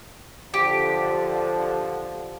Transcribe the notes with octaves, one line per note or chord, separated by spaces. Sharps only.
D3 F3 G4